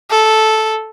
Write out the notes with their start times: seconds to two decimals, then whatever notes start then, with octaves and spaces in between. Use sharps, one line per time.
0.11 A4